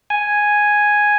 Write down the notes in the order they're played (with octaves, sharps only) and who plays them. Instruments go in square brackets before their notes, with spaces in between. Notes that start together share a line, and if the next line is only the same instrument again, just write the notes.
[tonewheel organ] G#5